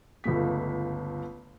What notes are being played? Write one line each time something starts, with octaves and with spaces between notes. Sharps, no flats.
G1 C#2 A3 B6